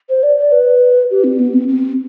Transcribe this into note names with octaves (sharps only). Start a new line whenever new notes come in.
C5
D5
D5
B4
G4
C4
B3
C4
C4